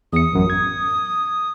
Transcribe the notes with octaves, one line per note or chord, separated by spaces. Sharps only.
E2 D#6 C#7
A1 F#2
G#6